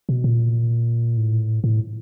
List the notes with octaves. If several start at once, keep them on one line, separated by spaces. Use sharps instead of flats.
B2
A#2
A2
A2